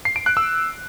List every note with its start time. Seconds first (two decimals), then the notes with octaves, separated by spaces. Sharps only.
0.05 C7
0.16 D7
0.26 F#6
0.37 E6